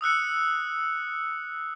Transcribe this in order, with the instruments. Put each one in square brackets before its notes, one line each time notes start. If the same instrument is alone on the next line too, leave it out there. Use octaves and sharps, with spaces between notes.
[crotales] D#6 E6 F#6 C#7